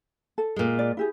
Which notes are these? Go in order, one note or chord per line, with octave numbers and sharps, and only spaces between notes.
A4
A#2 G#3
D5
E4 G4 G#4